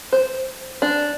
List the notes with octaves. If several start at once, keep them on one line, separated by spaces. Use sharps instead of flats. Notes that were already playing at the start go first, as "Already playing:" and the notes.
C5
D4